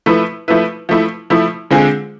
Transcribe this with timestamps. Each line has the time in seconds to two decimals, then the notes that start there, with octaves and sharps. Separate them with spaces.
0.06 F3 A3 E4 B4
0.48 F3 A3 E4 B4
0.89 F3 A3 E4
1.30 F3 A3 E4
1.70 D3 G#3 C4 F4 G#4